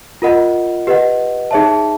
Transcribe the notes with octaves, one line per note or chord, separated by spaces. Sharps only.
F4 A#4 D#5 F#5 B5
G4 B4 D#5 F#5
D#4 G#4 C#5 E5 A5